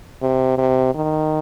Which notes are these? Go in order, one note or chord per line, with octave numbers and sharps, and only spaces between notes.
C3
C3
D#3